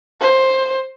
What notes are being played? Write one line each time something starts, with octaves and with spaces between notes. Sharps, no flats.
C5